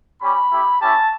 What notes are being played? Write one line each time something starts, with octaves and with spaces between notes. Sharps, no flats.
G3 C#4 G4 B5
A3 E4 G4
C#4 E4 G4 A5